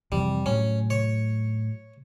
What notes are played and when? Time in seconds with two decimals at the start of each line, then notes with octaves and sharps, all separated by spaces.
0.12 F2 C3 E3 G3
0.46 A2 F#3 C#4
0.90 C#5